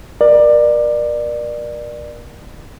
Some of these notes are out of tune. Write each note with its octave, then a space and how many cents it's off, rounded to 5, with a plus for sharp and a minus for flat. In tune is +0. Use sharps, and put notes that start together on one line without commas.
A#4 +35 D5 +20